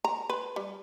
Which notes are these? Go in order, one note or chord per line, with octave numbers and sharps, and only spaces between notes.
A#5
B4
G3